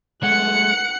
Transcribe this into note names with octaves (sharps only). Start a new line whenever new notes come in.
G#3 A3 F#5 F#6 C#7